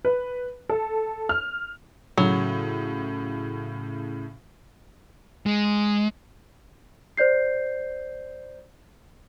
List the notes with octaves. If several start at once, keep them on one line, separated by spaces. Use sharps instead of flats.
B4
A4
F6
A2 C#3 F#3
G#3
C5 D5 G6 C7